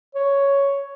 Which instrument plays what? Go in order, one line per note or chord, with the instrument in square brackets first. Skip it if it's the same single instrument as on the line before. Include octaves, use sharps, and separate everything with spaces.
[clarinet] C#5